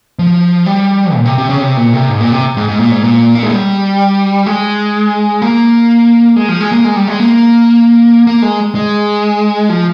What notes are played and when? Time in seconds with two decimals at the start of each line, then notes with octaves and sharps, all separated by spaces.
0.19 F3
0.66 G3
1.14 A#2
1.25 C3
1.38 C3
1.50 C#3
1.61 C3
1.77 A#2
1.93 C3
2.09 G#2
2.20 A#2
2.32 C3
2.57 G#2
2.68 G#2
2.80 A#2
2.91 G#2
3.04 A#2
3.35 A#3
3.43 G#3
3.51 G3
4.46 G#3
5.42 A#3
6.36 G#3
6.49 F3
6.60 G#3
6.72 A#3
6.84 G#3
6.96 G3
7.08 G#3
7.20 A#3
8.27 A#3
8.42 G#3
8.75 G#3
9.69 F3